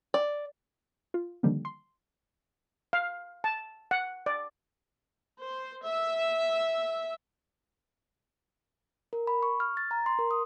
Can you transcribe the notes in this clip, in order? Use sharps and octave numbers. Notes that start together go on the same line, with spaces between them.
D5
F4
D3 D#3 F3 G3 A#3
C6
F5
A5
F#5
D5
C5
E5
A#4
B5
C#6
F6
A6
A#5
C6
A#4
D#6